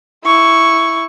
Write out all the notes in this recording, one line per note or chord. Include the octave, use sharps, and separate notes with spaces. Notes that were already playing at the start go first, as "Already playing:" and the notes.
E4 C#6